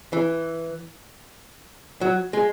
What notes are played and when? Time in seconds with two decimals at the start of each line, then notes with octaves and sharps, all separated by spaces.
0.13 E3
2.01 F#3
2.33 G#3